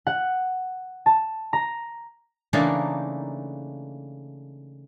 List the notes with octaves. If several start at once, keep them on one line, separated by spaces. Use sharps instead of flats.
F#5
A5
A#5
C#3 E3 A3 A#3 D4 D#4